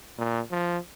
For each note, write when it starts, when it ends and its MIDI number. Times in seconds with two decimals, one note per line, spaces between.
0.18 0.41 46
0.51 0.78 53